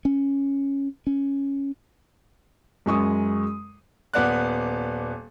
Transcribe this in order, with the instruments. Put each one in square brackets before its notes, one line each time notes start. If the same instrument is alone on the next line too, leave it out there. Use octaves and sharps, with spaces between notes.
[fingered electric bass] C#4
C#4
[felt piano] F#2 G#3 C#6 D#6
[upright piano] D#1 B3 D5 F#5 F#6